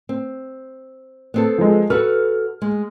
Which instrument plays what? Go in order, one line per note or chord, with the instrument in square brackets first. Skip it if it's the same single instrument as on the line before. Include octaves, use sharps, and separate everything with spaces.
[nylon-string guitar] C4
B3 C4 A4
[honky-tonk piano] F3 G#3
[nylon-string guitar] F#4 A4 B4 [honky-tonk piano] F6
[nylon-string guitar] G#3